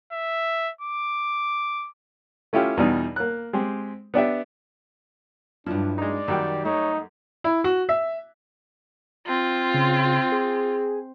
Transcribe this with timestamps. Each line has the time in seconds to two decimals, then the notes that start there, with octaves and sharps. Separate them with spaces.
0.13 E5
0.81 D6
2.53 A3 C#4 E4 F4 G4
2.77 E2 B2 G3 D4 D#4
3.16 A#3 F#6
3.53 G#3 C4 G4
4.14 B3 D4 G4 E5
5.66 G2 F3 F#3 D4 E4
5.98 G#3 D#4 D5
6.28 F#2 D#3 G3 F#4 G4 G5
6.65 A3 D#4 C#5
7.44 E4
7.64 F#4
7.89 E5
9.27 C4 F4
9.74 C#3
10.32 G#4